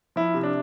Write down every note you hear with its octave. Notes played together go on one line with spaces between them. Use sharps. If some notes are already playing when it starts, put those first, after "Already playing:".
F3 E4
C3
D4